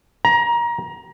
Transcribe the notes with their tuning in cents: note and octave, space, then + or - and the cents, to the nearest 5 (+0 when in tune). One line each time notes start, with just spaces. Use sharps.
A#5 +25